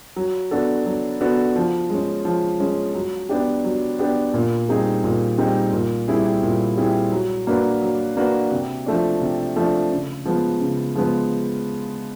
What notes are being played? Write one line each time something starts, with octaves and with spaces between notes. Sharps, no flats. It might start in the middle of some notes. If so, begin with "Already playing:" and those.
F#3
B3 D4 F#4 A4
F#3
B3 D4 F#4 A4
F3
G#3 C#4
F3
G#3 C#4
F#3
B3 D4 G4
F#3
B3 D4 G4
A#2
G3 C4 D#4 G#4
A#2
G3 C4 D#4 G#4
A#2
G3 C4 E4 G#4
A#2
G3 C4 E4 G#4
F#3
A#3 D4 F#4 B4
F#3
A#3 D4 F#4 B4
C3
F3 A3 D4
C3
F3 A3 D4
C#3
F3 G#3 B3
C#3
F3 G#3 B3